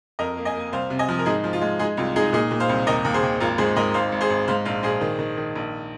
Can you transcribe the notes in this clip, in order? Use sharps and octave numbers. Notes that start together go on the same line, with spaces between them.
F2 A#4 D#5
A#3
D#5 G#5
A#3
C2 C5 F5
C3
D#5 G#5
F3
A#4
G#2 D#4 G#4
F3
F4
G#3
G#3 D#4 G#4
C2 F4
G#3 D#4 G#4
A#2 D#4 G#4
A#2
C5 F5
C2
D#2 A#4 D#5
D#2
G#4 C5
D#2
G#1 F4 A#4
G#2 G#4 C5
G#2 A#4 D#5
G#1 C5 F5
G#1
G#4 C5
G#1
G#2 C5 F5
A#1 C5 F5
A#1 G#4 C5
D#3
D#3
D#3
A#1